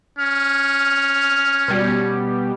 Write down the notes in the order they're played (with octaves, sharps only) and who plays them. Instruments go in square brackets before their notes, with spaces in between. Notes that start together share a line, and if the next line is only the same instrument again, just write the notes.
[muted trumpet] C#4 [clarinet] F6
[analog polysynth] B2 G3